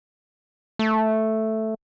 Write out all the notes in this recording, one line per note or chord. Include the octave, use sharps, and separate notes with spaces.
A3